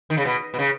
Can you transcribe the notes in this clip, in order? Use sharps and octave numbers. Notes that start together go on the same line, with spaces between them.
D#3
C#3
B2
B2
C#3